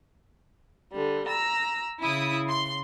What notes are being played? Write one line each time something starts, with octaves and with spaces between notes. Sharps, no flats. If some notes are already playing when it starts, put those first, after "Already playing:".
D3 G3
A#5 E6
C#3 E4 D#6
C6